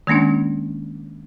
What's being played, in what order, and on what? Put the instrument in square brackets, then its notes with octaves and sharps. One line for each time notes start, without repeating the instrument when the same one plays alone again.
[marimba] D#3 G#3 A#3 C#4 D4